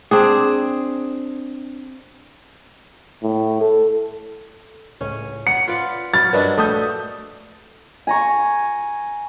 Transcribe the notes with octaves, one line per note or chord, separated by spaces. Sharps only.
C4 D4 G#4
A2
A4
C#2 A2 C#4
F#5 C#7
F4 B4 D5
F#2 F#3 B5 F6 A6
G2 F#3 D4 F#4 A#4 B4 D#5
A#1 A3 A4 D#6 G6
G#5 A#5 C#6